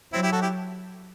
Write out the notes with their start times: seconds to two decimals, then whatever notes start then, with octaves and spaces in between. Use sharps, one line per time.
0.13 F#3 C4 E4
0.23 E4 G4
0.32 F#4 A4
0.41 E4 G4